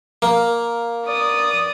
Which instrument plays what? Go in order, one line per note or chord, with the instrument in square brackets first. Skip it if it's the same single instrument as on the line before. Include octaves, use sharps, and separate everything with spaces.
[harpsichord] A#3
[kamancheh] D5 D#6